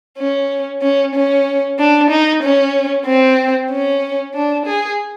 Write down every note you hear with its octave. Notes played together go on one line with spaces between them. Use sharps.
C#4
C#4
C#4
D4
D#4
C#4
C4
C#4
D4
G#4